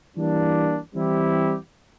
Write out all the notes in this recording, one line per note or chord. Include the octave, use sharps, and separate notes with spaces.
E3 G3 A#3 D4
E3 G3 C4 E4 G4